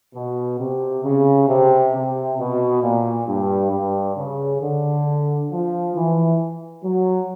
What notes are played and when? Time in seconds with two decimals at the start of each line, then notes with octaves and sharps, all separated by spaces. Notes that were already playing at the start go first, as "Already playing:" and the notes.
0.15 B2
0.59 C3
1.05 C#3
1.48 C3
1.93 C3
2.39 B2
2.83 A#2
3.27 G2
3.71 G2
4.17 C#3
4.61 D3
5.51 F3
5.95 E3
6.84 F#3